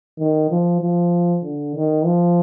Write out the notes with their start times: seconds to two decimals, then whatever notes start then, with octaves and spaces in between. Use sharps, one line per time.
0.19 D#3
0.51 F3
0.82 F3
1.44 D3
1.75 D#3
2.05 F3